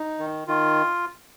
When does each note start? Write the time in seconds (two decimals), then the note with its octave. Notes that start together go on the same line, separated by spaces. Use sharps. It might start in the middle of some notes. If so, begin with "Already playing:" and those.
Already playing: D#4
0.19 D#3
0.47 D#3 F4